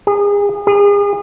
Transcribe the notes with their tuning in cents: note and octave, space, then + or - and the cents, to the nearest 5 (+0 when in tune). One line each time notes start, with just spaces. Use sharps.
G#4 -35
G#4 -40